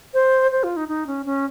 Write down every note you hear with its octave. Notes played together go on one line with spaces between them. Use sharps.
C5
C5
F4
D#4
D#4
C#4
C#4